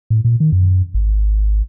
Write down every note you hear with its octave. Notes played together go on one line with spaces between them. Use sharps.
A2
A#2
D#3
F#2
G#1